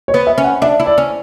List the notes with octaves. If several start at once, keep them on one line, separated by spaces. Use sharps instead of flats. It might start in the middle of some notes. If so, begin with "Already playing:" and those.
C#5
B3
E5
C#4
F#5
D4 E5
E4
D5
C#4